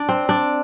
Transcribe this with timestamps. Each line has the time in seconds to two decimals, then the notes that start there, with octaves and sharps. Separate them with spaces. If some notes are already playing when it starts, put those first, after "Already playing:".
Already playing: D4
0.09 C4
0.29 D4